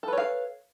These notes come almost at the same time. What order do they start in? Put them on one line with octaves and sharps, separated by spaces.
A4 B4 C#5 F5